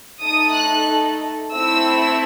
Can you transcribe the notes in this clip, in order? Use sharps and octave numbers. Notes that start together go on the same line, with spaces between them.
A3 D#4 A4 D#6
F#6
A3 C4 E4 E6